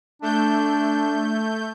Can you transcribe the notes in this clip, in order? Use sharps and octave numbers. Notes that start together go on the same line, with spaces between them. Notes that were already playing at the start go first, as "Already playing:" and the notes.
A3 D4 G6